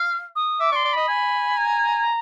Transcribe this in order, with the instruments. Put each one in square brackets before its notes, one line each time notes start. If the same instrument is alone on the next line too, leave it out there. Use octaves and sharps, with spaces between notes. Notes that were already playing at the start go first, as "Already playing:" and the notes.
Already playing: [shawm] F5
[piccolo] D#6
[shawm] E5 [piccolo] D6
[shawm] D5 [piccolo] C#6
[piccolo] C6
[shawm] D5
[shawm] D#5 [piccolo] B5
[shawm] G#5
[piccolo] A#5